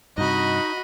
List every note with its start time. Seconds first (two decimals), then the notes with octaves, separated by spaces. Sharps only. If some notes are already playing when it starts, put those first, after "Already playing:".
0.18 G2 C3 D#4 F#4 D#5 B5